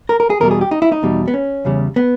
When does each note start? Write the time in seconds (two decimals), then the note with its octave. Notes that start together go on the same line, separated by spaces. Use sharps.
0.09 A#4
0.20 A#4
0.30 G#4
0.40 E2 B2 G3 A#4
0.51 G#4
0.61 G4
0.71 D#4
0.82 E4
0.92 D#4
1.03 E2 B2 G3
1.28 B3
1.34 C#4
1.65 E2 C#3 G3
1.96 B3